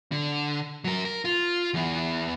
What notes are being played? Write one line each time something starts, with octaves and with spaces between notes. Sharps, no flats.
D3
F#3 A#4
A#4
F4
E2 E3